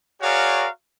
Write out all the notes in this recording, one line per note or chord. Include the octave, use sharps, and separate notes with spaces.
F#4 G#4 A#4 C#5 D5 F5